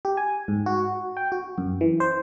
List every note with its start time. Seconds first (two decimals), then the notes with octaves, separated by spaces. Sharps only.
0.05 G4
0.17 G#5
0.48 G#2
0.66 F#4
1.17 G5
1.32 F#4
1.58 F#2
1.81 E3
2.00 C5